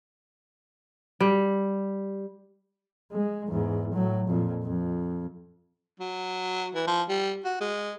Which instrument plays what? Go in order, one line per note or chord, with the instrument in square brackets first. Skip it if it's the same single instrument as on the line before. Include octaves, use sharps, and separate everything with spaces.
[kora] G3
[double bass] G#3
E2 G#2
A2 F#3
F2 A#2
F2
[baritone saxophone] F#3
E3
F3
G3
F#4
G#3